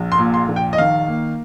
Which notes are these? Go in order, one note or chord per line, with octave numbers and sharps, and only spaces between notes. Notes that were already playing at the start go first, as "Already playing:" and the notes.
Already playing: A#1
C6
A#2
C6
A#1
G5
D#5
D#3 F5
A#3